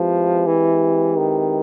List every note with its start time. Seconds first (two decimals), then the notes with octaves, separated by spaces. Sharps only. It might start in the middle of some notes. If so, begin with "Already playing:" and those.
Already playing: F3 G#3 C4 E4 G4 B4
0.47 E3
1.17 D#3